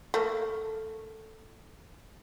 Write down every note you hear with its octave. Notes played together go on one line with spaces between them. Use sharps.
A3 A#3